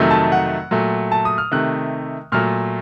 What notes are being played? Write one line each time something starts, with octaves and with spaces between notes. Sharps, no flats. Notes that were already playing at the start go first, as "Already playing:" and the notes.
Already playing: F2 C3 D#3 F#3 A3
A5
F#5
A#2 F#3 A3
A5
D#6
F6
C3 D#3 A3 F#6
A#2 F#3 A3 F6